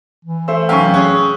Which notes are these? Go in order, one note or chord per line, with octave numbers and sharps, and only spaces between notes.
E3
A3 C5 E5 E6
F1 F#2 F5 G5 G#5 C#6 E6 B6
C#4 G#4 E6 F#6